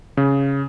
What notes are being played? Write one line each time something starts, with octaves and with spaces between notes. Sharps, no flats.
C#3